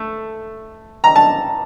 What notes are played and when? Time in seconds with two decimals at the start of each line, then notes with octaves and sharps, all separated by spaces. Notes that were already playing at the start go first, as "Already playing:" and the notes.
Already playing: A3
1.04 A#5
1.16 A5